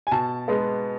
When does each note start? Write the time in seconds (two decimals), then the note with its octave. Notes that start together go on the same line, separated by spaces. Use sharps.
0.07 G#5
0.11 B2 A5
0.48 G#3 B3